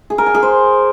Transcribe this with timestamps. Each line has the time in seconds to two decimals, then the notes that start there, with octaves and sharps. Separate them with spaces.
0.10 G#4
0.18 A#4
0.26 G#5
0.35 G#4
0.43 C5